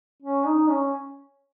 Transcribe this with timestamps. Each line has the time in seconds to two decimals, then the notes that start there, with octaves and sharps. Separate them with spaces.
0.22 C#4
0.46 D#4
0.70 C#4